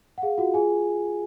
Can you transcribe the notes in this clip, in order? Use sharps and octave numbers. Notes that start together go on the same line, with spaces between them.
F#5
G#4 F5
F4 F#4 F#5
F4 G#4 G#5